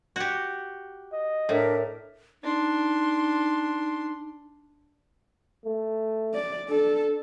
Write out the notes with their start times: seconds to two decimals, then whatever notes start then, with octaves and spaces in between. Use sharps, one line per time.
0.16 F#4 G4
1.13 D#5
1.49 A2 D4 A#4 E5
2.43 D4 D#4 C6
5.65 A3
6.34 D5
6.69 D4 A4